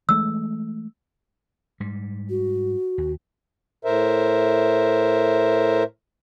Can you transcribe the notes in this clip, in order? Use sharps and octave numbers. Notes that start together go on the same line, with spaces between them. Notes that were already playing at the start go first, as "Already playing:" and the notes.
E3 G#3 A3 E6
G#2 G3
F#4
D#2
A2 A#4 C5 E5